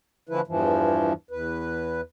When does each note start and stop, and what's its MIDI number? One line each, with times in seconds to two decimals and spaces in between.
0.29 0.41 50
0.29 0.41 52
0.29 0.41 53
0.29 0.41 57
0.29 0.41 64
0.29 0.41 71
0.47 1.13 40
0.47 1.13 43
0.47 1.13 52
0.47 1.13 53
1.31 2.01 40
1.31 2.01 71